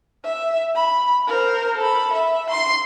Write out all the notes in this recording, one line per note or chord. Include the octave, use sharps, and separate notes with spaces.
E5
B5
A#4 C5
A4 B5
E5
C6